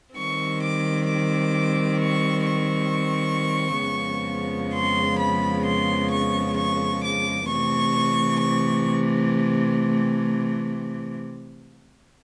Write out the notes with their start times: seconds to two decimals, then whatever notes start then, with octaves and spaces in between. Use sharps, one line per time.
0.15 D#3 G3 C4 C#6
0.61 D6
1.07 D6
1.99 C#6
2.45 C#6
3.82 F2 C#3 F3 G#3 B3
4.74 C6
5.20 B5
5.66 C6
6.12 C#6
6.57 C#6
7.04 D6
7.49 C3 E3 A3 C#6
8.42 C#6